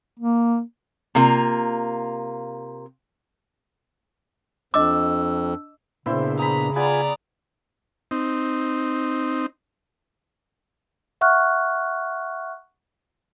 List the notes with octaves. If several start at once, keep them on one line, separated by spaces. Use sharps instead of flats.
A#3
C3 A#3 F4
F2 D4 D#5 D6 E6
A#2 C#3 B3 C4 D4 E4 C5
G#4 A#5 B5
B3 F4 G#4 D5 G#5 A#5
C4 D#4
E5 F#5 C#6 F6 F#6